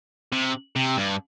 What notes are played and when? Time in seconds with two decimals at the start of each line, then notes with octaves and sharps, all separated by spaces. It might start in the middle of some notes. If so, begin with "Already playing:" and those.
0.32 C3
0.76 C3
0.97 G2